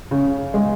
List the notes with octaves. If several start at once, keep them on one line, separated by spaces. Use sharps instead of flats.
C#3
G#3